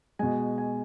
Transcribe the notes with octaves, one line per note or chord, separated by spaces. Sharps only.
B2 G#3 G#5
G#5